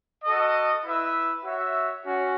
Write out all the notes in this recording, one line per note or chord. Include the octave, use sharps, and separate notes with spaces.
F#4 A4 D#5
E4 B4 E5
F#4 C#5 E5
C#4 F#4